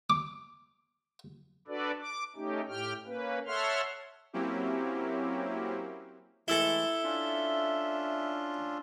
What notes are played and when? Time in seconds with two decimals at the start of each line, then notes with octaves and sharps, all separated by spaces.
0.10 D6
1.68 D4 F#4 A4 B4 D5
2.01 D6
2.36 A3 C#4 D#4 G4
2.69 A2 G4 G5 F6
3.06 A#3 C#4 B4
3.47 A4 C#5 E5 F#5 C6 F6
4.33 F#3 A#3 C4 C#4 E4 G4
6.48 E3 G#3 A3 E4 A4 E6 G7
7.04 C#4 D4 F4 E5